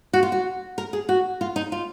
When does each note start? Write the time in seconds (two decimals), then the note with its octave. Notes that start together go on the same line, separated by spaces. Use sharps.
0.13 F#4
0.23 F4
0.32 F#4
0.78 A#4
0.93 G#4
1.09 F#4
1.41 F4
1.56 D#4
1.72 F4